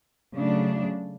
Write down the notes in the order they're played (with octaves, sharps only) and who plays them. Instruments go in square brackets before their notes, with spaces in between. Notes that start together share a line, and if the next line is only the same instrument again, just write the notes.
[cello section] C#3 F#3 A3 D4